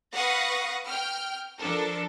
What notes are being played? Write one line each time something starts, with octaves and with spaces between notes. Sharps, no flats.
B4 F5 F#5 C#6 D#6 A#6
G5 F6
F3 D4 A4 A#4